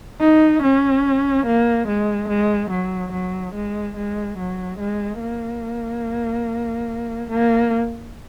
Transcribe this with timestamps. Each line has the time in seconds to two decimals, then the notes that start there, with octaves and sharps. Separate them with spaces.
0.21 D#4
0.63 C#4
1.46 A#3
1.87 G#3
2.29 G#3
2.71 F#3
3.12 F#3
3.55 G#3
3.97 G#3
4.38 F#3
4.79 G#3
5.21 A#3
7.30 A#3